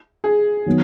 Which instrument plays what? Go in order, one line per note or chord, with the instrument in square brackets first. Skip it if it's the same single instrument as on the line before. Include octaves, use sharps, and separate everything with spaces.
[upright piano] G#4
[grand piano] D#3 F#3 B3